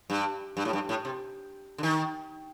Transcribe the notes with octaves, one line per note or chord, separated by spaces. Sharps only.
G2
G2
A2
G2
A2
C3
D3
D#3